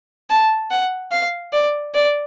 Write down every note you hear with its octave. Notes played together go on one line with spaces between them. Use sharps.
A5
F#5
F5
D5
D5